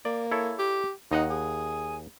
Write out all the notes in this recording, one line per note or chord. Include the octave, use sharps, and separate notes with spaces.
A#3 D5
E4 A4 C#5
G4
D#2 D#4 D#5 F#5
G#4